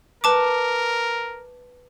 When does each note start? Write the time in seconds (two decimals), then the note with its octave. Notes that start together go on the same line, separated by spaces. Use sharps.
0.24 A#4 B4 A5 D6